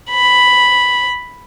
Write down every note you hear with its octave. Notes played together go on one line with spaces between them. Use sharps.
B5